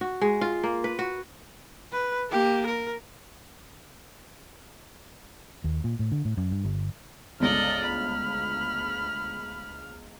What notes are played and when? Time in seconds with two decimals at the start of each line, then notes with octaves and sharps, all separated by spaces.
0.01 F#4
0.21 G#3
0.41 F4
0.64 A#3
0.84 B4
0.99 F#4
1.92 B4
2.30 A#3 G4
2.66 A#4
5.64 D#2
5.84 A#2
5.99 A2
6.12 D3
6.25 A2
6.37 F#2
6.51 G2
6.65 G1
7.40 G1 C#2 A4 D5 D#5 F6
7.85 D2 B5